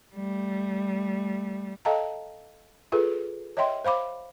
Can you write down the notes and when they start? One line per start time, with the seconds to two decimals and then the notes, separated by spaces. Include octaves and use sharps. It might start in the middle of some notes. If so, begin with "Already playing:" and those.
0.15 G3 A3
1.85 A4 D#5 F5 G5 A5 A#5
2.92 F4 G#4 A4 B4
3.57 C#5 D#5 E5 G5 C6
3.85 C5 F5 B5 D6